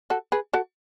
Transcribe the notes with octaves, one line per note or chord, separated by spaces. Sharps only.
F#4 A4
G#4 B4
F#4 A4